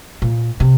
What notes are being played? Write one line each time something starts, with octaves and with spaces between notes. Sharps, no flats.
A#2
C3